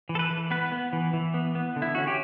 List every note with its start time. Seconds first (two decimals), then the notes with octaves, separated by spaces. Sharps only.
0.09 E3
0.15 A4
0.19 B4
0.31 E3
0.51 B3 B4
0.72 B3
0.93 E3
1.13 E3
1.34 B3
1.55 B3
1.76 D3
1.82 E4
1.95 C#4 F#4
2.07 G4